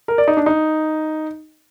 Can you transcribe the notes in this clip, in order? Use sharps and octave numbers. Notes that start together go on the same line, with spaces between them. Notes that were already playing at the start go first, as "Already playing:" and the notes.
A#4
D5
D#4
D4
D#4